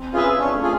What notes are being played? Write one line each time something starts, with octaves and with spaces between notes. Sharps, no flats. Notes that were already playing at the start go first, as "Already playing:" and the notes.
Already playing: C4
C#4 F4 G#4 B4 E5
C#4 D4
A3
F4 G#4